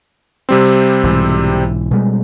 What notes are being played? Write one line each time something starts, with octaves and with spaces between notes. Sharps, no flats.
C3 G3 C4
B1 G#2 E3
B2 G3 G#3